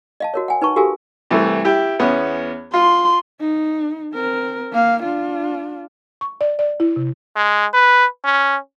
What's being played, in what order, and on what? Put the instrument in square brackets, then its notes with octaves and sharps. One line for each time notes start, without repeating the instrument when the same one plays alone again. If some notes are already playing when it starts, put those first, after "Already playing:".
[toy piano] D#5 F5 A5
F#4 A#4 C#5
F#5 G#5
D#4 B4 A5 C#6
F#4 G4 A4 A#4 F5 G#5
[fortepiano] C2 E3 A3
E4 G4 G5
E2 B3 C#4
[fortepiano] F4 [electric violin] C6
[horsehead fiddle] D#4
C4 A#4
A#3 F5
D4 F4
[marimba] C#6
D5
D5
E4
C3
[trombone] G#3
B4
C#4